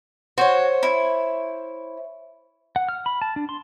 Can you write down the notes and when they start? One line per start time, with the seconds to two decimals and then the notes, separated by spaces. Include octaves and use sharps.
0.38 F#4 C5 C#5
0.83 E4
2.76 F#5
2.89 F6
3.06 B5
3.22 A5
3.36 D4
3.49 C6